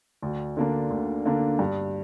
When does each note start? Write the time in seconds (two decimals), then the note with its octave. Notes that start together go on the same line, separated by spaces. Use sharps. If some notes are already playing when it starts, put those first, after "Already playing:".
0.22 D2
0.57 D3 A#3 D4
0.90 D2
1.25 D3 A#3 D4
1.59 G2